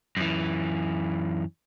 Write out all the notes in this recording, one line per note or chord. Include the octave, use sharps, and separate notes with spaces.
F#2 E3